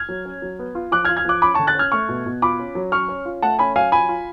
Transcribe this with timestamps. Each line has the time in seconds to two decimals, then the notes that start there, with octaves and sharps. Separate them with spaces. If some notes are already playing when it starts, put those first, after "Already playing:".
Already playing: F6 G#6
0.09 F#3
0.25 C#4
0.42 F#3
0.59 B3
0.75 F4
0.92 F3 D6 F#6
1.05 F6 G#6
1.09 F4
1.17 F6 G#6
1.25 F3 D6 F#6
1.42 C#4 B5 D6
1.54 A5 C#6
1.59 D3
1.67 F#6 A6
1.75 C#4 F6 G#6
1.92 A3 C#6 F6
2.09 B2
2.26 B2
2.42 F4 B5 D6
2.59 C#4
2.75 F#3
2.92 C#4 C#6 F6
3.09 C#4
3.25 F4
3.42 A3 F#5 A5
3.59 C#4 G#5 B5
3.76 F#3 F5 G#5
3.92 F4 G#5 B5
4.09 F4